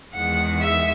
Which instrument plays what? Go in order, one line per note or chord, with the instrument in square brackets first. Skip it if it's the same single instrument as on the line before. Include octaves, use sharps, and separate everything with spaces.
[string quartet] E2 D#3 G#3 F#5
E5